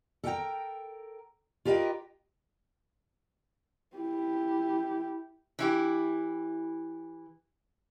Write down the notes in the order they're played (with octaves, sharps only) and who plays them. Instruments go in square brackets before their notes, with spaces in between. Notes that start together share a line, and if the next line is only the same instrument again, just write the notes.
[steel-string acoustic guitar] A4 A#4 D#5 F5 G5 A#5
F4 G4 A#4 B4 D#5 G5
[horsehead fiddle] E4 G4
[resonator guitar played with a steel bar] E3 E4 G4